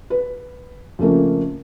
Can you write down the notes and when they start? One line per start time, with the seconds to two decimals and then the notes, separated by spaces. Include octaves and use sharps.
0.10 B4
0.99 F2 C#3 A3 A#3